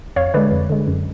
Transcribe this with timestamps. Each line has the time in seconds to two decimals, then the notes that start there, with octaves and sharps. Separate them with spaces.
0.16 F2 C#5 F5
0.34 D3 G#3 B4 D5
0.52 F2
0.70 D3 G#3
0.88 F#2